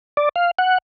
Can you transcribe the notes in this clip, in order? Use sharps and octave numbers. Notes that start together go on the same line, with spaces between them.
D5
F5
F#5